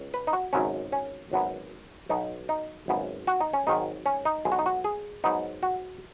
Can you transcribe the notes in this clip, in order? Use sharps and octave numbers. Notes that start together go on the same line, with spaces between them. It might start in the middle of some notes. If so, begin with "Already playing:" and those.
Already playing: C#2
B4
D#4
F#4
G#1 F#2 C#3 F#3 C#4
C#4
G#1 F#2 F#3 B3
B1 B2 B3 D#4
D#4
G#1 F#2 C#3 B3
F#4
D#4
C#4
G#1 G#2 D#3 F#3 D#4
C#4
D#4
B1 B2 G#3 G#4
F#4
D#4
F#4
G#4
G#2 F#3 B3 D#4
F#4